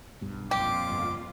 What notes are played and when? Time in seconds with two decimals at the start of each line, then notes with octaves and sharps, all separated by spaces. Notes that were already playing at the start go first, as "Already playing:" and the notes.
0.21 B1 G2
0.51 F2 A#2 F4 G4 D6
0.90 G1 G2